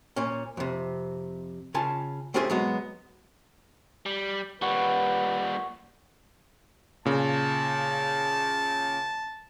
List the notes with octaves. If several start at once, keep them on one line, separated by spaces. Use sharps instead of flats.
A#2 C#4
F2 C3
C#3 F4 G#5 A5
A3 C4 C#4 F4 G4 G#4
F#3 G#3 B3
G3
A#2 G3 B4 C#5 F#5
A#2 C#3 A5